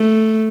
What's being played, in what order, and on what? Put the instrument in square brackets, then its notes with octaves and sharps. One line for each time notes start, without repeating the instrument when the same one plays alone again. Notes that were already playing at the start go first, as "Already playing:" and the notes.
Already playing: [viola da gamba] A3